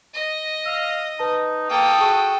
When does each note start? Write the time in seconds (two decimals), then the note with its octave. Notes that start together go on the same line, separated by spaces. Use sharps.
0.14 D#5
0.66 F5 E6
1.19 D#4 B4 A5
1.70 A#3 A4 G5 D#6
2.00 F#4 G#4 A5 C#6